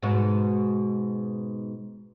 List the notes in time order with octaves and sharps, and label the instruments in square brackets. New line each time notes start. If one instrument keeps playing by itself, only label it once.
[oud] G#2 B2